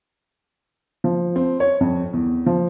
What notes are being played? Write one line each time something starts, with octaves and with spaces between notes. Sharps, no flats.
F3
C4
C#5
F2
E2
F3